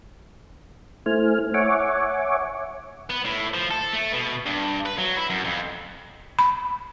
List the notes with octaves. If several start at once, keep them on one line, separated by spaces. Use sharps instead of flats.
A3 E4 C5 G#5 F6
C#5 E5 F#5 G#5 C#6 D6
B3
A2
F3
A4
A3
B2
G2
B4
F#3
E4
F#2
F2
B5